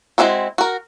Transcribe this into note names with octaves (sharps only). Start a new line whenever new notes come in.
G#3 A3 C4 E4 F#4
F#4 A#4